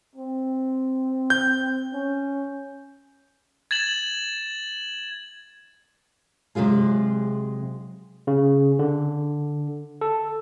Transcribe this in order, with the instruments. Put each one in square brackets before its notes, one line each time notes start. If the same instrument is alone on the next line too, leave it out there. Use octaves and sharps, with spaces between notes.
[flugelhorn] C4
[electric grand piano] G6
[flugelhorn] C#4
[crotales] G#6 A6 E7 F#7
[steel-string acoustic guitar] C3 F#3 G#3 F4 G#4
[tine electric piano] C#3
D3
A4